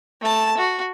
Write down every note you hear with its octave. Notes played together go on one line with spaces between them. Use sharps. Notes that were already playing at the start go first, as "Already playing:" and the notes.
A3 A5
F#4